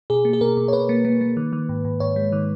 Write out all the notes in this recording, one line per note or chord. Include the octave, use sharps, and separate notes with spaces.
B2 G#4
A#3
G#4
B2 A#4
B2
C#5
B2 B4
A#3
A#3
A#3
D#3
D#3
G#2
G#2
G#2 C#5
G#3
D#3